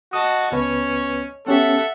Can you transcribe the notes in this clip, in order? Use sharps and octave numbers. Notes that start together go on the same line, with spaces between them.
F#4 D#5 A5 D#6
C#2 B3 C#4 B4 C#5
B3 C#4 G4 A4 E5 F#5